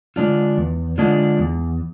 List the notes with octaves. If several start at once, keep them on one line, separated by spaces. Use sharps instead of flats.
D3 G#3 D4 F4
E2
D3 G#3 D4 F4
E2